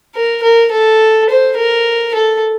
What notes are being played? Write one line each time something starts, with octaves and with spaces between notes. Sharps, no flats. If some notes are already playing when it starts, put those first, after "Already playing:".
A#4
A#4
A4
C5
A#4
A4